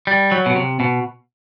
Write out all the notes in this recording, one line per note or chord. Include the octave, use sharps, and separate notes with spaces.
G3
F#3
B2
C3
B2